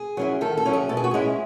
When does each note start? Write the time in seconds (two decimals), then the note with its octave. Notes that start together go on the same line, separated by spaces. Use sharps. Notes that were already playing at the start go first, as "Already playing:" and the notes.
Already playing: G#4
0.17 F#3 C#4 E4
0.41 D#3 A4
0.57 A4
0.65 F#3 C#4 E4
0.73 G#4
0.89 B2 A4
0.97 G#4
1.04 F#4
1.11 G#3 C#4 E4 G#4